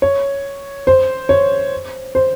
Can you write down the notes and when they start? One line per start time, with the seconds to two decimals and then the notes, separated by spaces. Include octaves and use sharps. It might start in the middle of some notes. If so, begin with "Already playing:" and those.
0.02 C#5
0.87 C5
1.29 C#5
2.15 C5